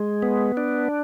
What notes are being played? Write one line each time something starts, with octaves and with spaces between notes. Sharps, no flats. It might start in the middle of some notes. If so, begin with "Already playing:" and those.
Already playing: G#3
B3
D4